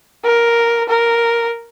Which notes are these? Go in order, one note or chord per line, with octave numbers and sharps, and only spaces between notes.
A#4
A#4